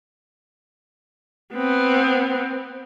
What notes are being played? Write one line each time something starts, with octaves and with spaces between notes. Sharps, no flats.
B3 C4